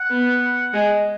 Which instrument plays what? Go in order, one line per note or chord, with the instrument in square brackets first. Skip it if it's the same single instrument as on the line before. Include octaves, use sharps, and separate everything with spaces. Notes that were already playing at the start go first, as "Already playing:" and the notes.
Already playing: [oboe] F#5
[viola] B3
G#3